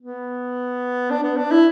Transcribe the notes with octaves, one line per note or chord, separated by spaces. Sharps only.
B3
D4
B3
D4
E4